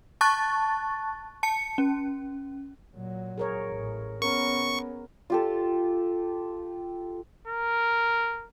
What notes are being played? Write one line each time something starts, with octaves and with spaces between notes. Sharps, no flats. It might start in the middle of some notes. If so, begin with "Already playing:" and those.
A5 C#6 F#6 A6
A5 C#7
C#4
A#2 F#3
G#4 A#4 C#5
A1
B3 C#4 A#4 C#6
F4 G4 A4
A#4